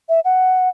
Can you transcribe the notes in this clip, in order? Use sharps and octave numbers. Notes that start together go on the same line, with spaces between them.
E5
F#5